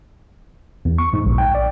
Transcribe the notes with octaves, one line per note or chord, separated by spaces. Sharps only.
E2
C#6
G#2
A#1
G5
D5